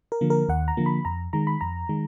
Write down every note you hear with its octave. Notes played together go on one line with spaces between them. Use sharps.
A#4
D3 F3 A#3
A#4
D#2 F#5
A#5
D3 F3 A#3
B5
F2 A#5
D#3 G#3 A#5
B5
F2 A#5
D#3 G#3